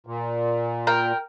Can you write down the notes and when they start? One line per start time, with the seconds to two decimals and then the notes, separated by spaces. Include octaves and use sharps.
0.07 A#2
0.87 A#4 G5